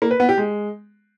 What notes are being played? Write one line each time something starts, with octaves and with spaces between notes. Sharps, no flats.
A#3
B4
B3
G4
G#3